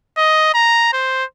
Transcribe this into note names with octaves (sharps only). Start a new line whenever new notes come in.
D#5
A#5
C5